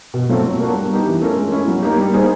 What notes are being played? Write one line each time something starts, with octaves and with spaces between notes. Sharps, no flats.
B2
F#3 A3 C4 F4
F#3
A#3 D4 F#4
G3
B3 D#4 G4
E3
A3 C#4 F4 A#4
G#3
C#4 E4
F#3
A#3 D#4 G4
G3
A#3 D#4 G#4 C5